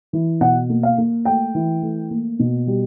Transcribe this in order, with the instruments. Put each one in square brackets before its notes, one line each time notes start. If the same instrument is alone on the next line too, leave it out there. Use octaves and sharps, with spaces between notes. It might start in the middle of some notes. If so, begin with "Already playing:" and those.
[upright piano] E3
B2 F#5
A#3
F5
A#3
A3 G5
E3
A3
A#3
B2
G3